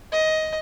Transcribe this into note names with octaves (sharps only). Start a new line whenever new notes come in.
D#5